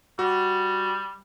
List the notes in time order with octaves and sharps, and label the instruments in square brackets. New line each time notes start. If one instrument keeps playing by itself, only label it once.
[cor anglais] G3 [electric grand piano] F#4